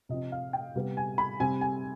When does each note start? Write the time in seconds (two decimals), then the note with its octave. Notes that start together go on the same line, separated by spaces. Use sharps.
0.09 C3 F3 C4 D#5
0.32 F5
0.53 G5
0.75 C3 G3 B3
0.97 G#5
1.18 B5
1.40 C3 G3 C4 G#5
1.61 G#5